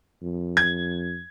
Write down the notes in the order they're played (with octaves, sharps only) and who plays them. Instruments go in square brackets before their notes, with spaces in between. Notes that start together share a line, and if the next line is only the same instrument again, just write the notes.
[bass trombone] F2
[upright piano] G#6